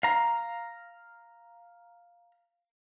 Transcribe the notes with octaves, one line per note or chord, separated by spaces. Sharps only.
F5 A#5